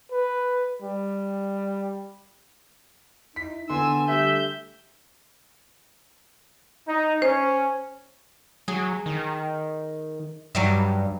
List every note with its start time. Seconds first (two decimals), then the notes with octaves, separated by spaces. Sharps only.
0.12 B4
0.82 G3
3.36 D#4 E4 B6
3.70 D3 B3 G#5 C6 E6
4.08 G3 A3 G4 E5 G6
6.88 D#4
7.22 C#4 C5
8.68 F#3 G#4
9.06 D#3
10.55 G2 F#3 G3 E5